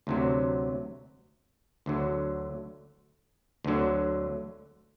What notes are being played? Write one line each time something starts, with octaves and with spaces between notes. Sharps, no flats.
D2 C3 F#3
D2 D3 F#3
D2 D3 F#3